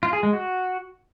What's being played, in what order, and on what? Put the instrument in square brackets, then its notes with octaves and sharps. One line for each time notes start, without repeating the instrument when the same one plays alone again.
[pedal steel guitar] F4
G#4
G#3
F#4